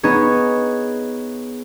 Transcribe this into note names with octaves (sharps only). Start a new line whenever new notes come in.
B3 D#4 G#4 C#5